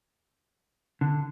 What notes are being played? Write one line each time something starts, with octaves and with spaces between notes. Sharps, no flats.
D3